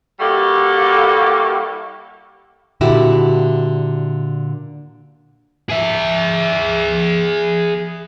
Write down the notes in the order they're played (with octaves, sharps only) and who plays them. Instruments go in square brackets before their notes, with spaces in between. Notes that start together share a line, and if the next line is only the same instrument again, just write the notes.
[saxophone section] G3 A#3 E4 F#4 G4 A4
[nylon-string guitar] A#2 D3 E4 F#4 G4
[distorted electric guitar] G#4 E5